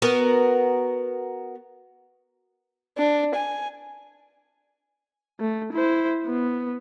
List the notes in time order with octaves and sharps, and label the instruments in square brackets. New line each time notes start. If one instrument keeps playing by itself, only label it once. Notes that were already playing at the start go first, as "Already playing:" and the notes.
[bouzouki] B3 F#4 A#4
[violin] D4
G#5
[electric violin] A3
E4 C5
B3